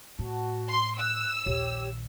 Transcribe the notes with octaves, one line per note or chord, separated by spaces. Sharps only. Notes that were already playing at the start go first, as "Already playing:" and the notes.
A2 F#4 A5
C6
E6 F#6
A#1 D#2 G4 C#5